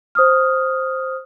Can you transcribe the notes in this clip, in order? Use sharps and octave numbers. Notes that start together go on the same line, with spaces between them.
C5 D#6 F6